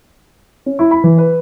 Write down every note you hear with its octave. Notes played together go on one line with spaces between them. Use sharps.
C#4
E4
B5
E3
B4